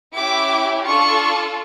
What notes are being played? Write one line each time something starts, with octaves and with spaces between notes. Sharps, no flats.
C#4 E4 G4 D6
D4 F4 A4 C#6